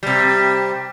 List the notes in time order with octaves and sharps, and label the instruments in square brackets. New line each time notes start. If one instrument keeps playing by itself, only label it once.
[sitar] C3 G3